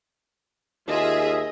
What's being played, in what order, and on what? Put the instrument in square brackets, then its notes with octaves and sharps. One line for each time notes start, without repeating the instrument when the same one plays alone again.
[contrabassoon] D#2 [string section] F4 G#4 E5 [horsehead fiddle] D#5